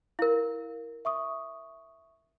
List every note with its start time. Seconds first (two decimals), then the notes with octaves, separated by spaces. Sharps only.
0.19 E4 A#4 F5
1.05 E5 C#6 D#6